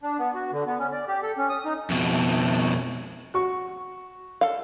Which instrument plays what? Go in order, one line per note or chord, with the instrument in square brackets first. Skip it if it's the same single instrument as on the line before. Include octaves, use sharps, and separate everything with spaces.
[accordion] D4
B3
F#4
D3
B3
C#4
D5
G4
A4
C#4
D#6
D#4
[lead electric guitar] F2 B2
[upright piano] F#4 C#6
[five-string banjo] A4 F5